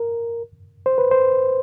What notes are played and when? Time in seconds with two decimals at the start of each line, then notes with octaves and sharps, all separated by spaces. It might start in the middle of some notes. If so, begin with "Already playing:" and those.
Already playing: A#4
0.86 C5
0.98 B4
1.11 C5